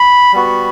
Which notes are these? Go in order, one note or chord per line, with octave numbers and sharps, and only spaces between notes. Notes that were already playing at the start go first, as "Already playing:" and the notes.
Already playing: B5
G3 B3 F#4